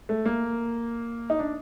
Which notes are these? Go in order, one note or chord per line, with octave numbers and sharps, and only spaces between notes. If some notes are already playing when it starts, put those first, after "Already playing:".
A3
A#3
D#4
D4